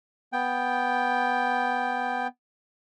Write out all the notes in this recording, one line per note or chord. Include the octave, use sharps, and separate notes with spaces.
B3 G5